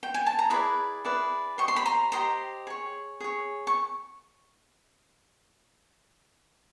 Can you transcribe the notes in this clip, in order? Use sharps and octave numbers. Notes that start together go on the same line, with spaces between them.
G5
G#5
A5
A#5
E4 G#4 B4 D5 B5
E4 G#4 B4 D5
G4 C5 D#5 C#6
C6
B5
A#5 C6
G4 C5 D#5 A#5 C6
G#4 C#5
G#4 C#5
C#6